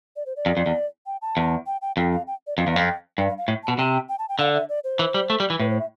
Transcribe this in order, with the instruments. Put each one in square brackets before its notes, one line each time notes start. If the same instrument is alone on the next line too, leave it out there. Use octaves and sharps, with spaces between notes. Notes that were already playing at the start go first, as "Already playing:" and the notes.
[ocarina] D5
C5
D5
[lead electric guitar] F2
F2
E2
[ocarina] G5
A5
[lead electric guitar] E2
[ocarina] G5
G5
[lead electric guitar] F2 [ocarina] G5
[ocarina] F5
G5
D5
[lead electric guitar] F2 [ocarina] F5
[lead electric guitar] E2
[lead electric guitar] F2 [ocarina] F5
[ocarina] G5
[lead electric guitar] G2 [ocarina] G5
[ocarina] F5
F5
[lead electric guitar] A2
[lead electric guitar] B2 [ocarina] A5
[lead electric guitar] C3 [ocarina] G5
[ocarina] G5
A5
G5
[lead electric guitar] D3 [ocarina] F5
[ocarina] E5
D5
C5
[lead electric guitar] E3
G3
A3
G3
E3
[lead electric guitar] A2 [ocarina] B4
[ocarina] C5
E5